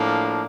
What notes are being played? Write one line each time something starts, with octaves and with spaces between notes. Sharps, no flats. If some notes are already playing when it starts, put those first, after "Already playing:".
Already playing: A2 F3 A#3 D4